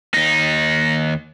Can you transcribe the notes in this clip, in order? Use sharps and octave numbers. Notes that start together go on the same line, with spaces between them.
D#2 D#4